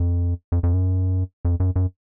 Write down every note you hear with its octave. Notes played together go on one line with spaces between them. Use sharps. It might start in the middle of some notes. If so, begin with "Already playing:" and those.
Already playing: F2
F2
F2
F#2
F2
F#2
F#2